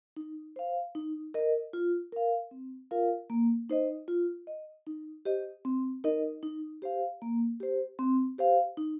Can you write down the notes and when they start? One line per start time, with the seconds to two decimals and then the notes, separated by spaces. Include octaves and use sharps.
0.16 D#4
0.56 C5 F5
0.95 D#4
1.34 A#4 D#5
1.73 F4
2.12 A#4 F5
2.51 C4
2.91 F4 A#4 F5
3.30 A#3
3.70 D#4 C5 D#5
4.08 F4
4.47 D#5
4.87 D#4
5.25 G4 C5 D#5
5.65 C4
6.04 D#4 A#4 D#5
6.43 D#4
6.82 G4 C5 F5
7.22 A#3
7.60 G4 C5
7.99 C4
8.39 G4 C5 F5
8.77 D#4